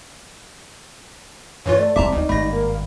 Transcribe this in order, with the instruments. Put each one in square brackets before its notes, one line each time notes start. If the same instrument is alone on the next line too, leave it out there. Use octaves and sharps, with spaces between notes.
[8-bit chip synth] G2 E3 F4 [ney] C#5
[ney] A3 [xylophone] D5
[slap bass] E1 C2 [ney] C4 [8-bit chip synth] E5 A5 A#5 [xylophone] D6
[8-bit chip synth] D2 [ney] D#4
[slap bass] G#1 G2 [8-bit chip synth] A3 A#6 [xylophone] B5
[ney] A#3